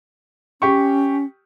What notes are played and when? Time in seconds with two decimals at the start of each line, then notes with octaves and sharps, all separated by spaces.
0.62 C#4 G4 C#6